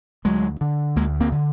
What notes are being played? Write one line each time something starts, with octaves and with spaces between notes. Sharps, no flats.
D2 F#3 G#3
D3
D2 G#3 A#3
A#3 C4
D3